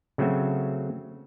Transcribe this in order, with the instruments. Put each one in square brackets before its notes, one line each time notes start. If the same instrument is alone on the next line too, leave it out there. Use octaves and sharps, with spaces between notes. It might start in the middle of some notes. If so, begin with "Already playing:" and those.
[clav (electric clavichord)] C#3 F#3 A3 C4 F#4 E5